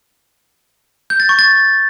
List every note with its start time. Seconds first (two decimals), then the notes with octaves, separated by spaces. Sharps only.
1.10 G6
1.20 A6
1.29 C#6
1.39 A6